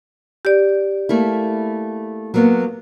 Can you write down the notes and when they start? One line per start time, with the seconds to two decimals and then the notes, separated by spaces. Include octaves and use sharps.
0.45 G4 D5
1.09 A3 A#3 E4
2.34 F#3 A#3 B3